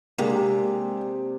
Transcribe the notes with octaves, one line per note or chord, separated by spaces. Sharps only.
C3 G#3 A#3 D4 G4 G#4